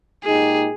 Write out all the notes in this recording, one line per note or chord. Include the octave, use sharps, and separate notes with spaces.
A#2 G#3 D#4 G4 G#4